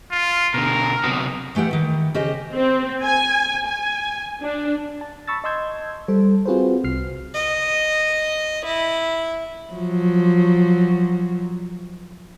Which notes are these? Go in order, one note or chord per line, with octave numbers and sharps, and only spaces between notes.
F4
B2 D3 A#4
C3 F#3 B3
E3 A3 B3 G4 F#5
D#3 E3
C#3 G4 C5 D#5
C4
G#5
G#5
D4
A5
B5 C#6 E6 A6
D#5 A5 C6 E6 G6 G#6
G3 A4 C5
C4 F4 F#4 G#4 B4 C5
C2 F6 C7
D#5
E4
F3 F#3